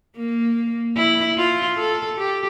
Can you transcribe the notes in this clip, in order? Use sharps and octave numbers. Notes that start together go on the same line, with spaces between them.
A#3
E4
F4
A4
G4